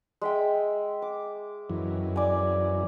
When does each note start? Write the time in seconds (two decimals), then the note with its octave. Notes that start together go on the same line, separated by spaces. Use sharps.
0.21 G#3 E5 G5
1.02 D6
1.70 F#2 E3
2.16 D5 G#5